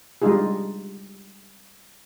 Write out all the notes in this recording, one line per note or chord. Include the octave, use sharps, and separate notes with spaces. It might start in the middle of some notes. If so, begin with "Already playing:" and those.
G3 G#3 D4 D#4 F4 G#4